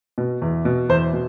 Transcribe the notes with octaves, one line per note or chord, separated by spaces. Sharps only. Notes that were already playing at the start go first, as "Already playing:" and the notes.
B2
E2
B2
E2 C5
B2